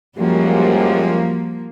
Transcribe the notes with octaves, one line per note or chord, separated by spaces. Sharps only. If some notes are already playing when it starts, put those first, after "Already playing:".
F#2 F3 G3 G#3 A#3 F#4 G4